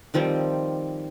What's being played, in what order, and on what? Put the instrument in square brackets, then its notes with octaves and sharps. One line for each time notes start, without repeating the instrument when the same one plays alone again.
[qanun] D#3 F3 G3 C4